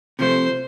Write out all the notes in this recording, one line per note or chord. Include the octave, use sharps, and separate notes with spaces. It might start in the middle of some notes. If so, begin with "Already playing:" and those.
C3 F3 A3 C5